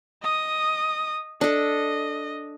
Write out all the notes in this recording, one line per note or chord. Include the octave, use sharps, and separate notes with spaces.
D#5 D#6
D4 A4 D#5